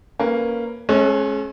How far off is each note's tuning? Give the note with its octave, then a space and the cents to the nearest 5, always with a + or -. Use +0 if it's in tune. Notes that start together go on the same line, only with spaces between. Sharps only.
A#3 +0 C#4 +0 B4 +0
G#3 +30 C#4 -25 A4 +0